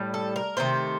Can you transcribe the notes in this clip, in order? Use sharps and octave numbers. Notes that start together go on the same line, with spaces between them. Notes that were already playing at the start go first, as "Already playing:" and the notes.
Already playing: A2 G3
A4
A#4
C3 D#3 A3 C5